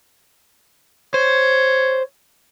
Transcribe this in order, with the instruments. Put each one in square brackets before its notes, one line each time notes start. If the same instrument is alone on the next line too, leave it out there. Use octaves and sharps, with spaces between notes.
[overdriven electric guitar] C5 [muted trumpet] C#5